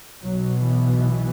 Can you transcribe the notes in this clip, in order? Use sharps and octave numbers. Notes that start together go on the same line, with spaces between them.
B1 B2 F#3
E3